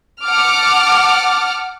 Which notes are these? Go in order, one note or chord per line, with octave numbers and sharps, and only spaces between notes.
F#5 A5 D6 F6